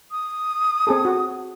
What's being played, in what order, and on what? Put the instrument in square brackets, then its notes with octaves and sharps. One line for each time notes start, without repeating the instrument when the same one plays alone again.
[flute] D#6
[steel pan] C4 G#4 A4
F#4